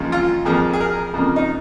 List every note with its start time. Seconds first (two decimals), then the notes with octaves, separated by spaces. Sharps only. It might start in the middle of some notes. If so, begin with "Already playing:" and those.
Already playing: D#2 C#3 F3 G#3 F4
0.12 F4
0.45 F2 F3 A#3 G#4
0.73 G#4
0.80 A#4
1.14 F2 C#3 A#3
1.36 D#4